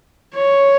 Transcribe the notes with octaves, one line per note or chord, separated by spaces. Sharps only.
C#5